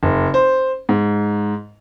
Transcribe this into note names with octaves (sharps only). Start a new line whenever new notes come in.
F#1
C5
G#2